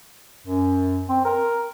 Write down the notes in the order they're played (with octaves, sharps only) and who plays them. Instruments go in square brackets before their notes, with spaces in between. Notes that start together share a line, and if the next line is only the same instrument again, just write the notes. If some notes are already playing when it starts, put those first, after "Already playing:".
[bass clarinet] F#2
C4
A#4